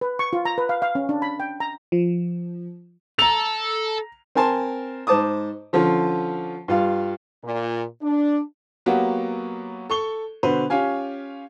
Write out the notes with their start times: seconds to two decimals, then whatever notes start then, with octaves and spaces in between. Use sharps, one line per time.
0.01 B4
0.19 C#6
0.33 F4
0.45 A#5
0.58 B4
0.69 F5
0.82 F5
0.95 C#4
1.09 D4
1.22 B5
1.40 G5
1.60 A#5
1.92 F3
3.19 A4 A#5 F7
4.35 C4 A#4 G#5 A5 C6
5.07 G#2 C5 A5 D6 D#6
5.73 D3 F3 C#4 F4
6.68 G2 F4 F5
7.44 A#2
8.02 D4
8.86 F#3 A#3 B3 F#4 G4
9.90 A4 C#6 G7
10.43 B2 D3 F#4 B4 C5
10.70 C#4 F4 G4 F5 G#5